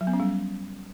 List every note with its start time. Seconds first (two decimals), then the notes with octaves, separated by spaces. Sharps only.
0.01 F#3
0.07 B3
0.13 C#4
0.20 G3